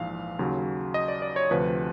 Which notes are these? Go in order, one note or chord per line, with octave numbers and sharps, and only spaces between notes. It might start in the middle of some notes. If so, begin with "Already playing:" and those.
Already playing: A#1 G#2 E3 F5
D#2 C#3 F#3
D#5
D5
D5
C#5
D2 C3 F3 B4